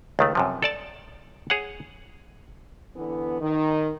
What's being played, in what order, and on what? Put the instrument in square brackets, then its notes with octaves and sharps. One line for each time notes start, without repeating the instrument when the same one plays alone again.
[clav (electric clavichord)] C#2 D#3 A3
F#2 C3 F3
A4 D5 A5
G#4 C#5 F#5
[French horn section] D3 E3 B3
D#3